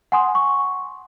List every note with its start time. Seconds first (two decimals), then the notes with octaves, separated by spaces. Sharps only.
0.12 F#5 G#5 C6 D#6
0.35 C#6